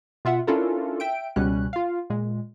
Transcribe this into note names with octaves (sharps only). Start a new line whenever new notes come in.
B2 F4 E5 F#5
C#4 D4 E4 F4 A4 A#4
E5 G5 D7
C#2 B2 G3 C#4 F#6
F4 F5
A#2 G#3